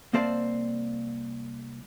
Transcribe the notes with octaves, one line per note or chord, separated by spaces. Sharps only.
C2 A#3 C4 C5 D5 A5